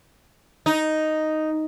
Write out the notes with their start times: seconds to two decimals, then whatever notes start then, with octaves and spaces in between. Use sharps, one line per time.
0.66 D#4